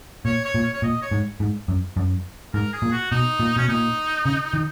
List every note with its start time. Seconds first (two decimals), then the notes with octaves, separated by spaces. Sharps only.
0.25 A#2 C#5
0.45 C#5
0.54 A#2
0.63 C#5
0.73 C#5
0.82 A#2 D#5
1.02 C#5
1.11 G#2
1.40 G#2
1.68 F#2
1.96 F#2
2.53 G#2 A#4
2.73 G#4
2.82 A#2
2.92 F#4
3.11 B2 D#4
3.40 A#2
3.56 B2 C#4
3.68 A#2 D#4
4.26 C#3
4.54 D#3